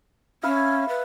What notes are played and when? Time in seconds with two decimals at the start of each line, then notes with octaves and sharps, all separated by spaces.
0.43 C#4 E5 F5 B5
0.89 B4